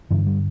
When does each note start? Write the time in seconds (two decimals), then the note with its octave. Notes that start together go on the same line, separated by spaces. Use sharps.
0.11 G2 D3 E3
0.27 G3